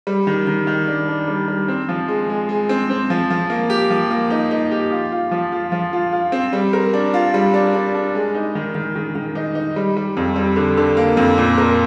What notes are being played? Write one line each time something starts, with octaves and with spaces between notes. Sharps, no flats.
G3
D#3
D#3
D#3
D4
D4
G3
G3
C4
F3
G#3
G#3
G#3
C4
C4
F3
F3
A#3
G4
F3
A#3
D#4
D#4
G4
F4
F4
F3
F4
F3
F4
F4
C4
G3
A#4
D4
F4
G3
D4
D4
D4
G#3
D#4
D#3
D#3
D#3
D#3
D#4
D#4
G3
G3
F2
G3
D3
D3
A#3
F2
A#2
A#4